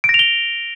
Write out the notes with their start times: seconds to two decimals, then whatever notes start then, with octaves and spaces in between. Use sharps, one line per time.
0.04 D7
0.09 A#6
0.14 F7
0.19 G7